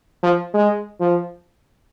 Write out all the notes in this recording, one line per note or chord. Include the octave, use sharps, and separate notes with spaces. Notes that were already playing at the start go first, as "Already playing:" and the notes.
F3
G#3
F3